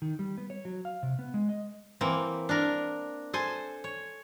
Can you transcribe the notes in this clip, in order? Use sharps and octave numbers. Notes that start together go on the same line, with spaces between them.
D#3
G3
B3
C#5
F#3
F5
C3
B3
G#3
D#5
E3 A#3 C4
D4 A#4
A4 C5 G#5
C#5